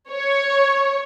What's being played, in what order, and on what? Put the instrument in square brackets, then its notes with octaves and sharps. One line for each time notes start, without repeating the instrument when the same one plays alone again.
[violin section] C#5